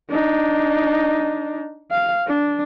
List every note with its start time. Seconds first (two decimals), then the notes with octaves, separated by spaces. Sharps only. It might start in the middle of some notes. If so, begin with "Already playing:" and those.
0.10 D4 D#4
1.91 F5
2.27 D4